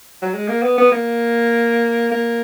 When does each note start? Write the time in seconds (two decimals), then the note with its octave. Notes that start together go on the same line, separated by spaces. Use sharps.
0.22 F#3
0.34 G#3
0.48 A#3
0.63 B3
0.78 B3
0.92 A#3
2.11 A#3